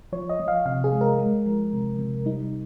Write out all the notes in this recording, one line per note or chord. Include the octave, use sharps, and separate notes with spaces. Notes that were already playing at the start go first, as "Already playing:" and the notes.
F3 C#5
D#5
F3
F5
C3 F5
G#4
G#3
A#4
G#3
F3
C3
C3
G3 D#4